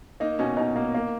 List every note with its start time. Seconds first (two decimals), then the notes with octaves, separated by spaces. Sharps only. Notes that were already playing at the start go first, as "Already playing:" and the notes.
0.20 A#3 D#4
0.39 B2 C#4
0.57 B2 D#4
0.76 A#3
0.95 A#3